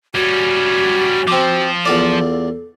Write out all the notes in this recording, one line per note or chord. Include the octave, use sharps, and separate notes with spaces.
G3 C#4 F#4
F3 C4 D6
E2 F4 A4 D5